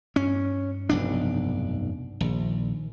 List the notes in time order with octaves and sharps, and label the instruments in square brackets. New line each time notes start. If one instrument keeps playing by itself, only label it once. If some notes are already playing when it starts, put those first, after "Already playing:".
[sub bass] G2 [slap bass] C#4
[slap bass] F1 B1 D4
[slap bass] A#1 [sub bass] D#3